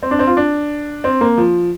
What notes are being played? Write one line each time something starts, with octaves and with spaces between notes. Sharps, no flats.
C4
D4
C4
F4
D4
C4
A#3
F3